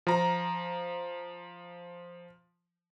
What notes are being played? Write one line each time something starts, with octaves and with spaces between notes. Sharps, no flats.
F3 A#5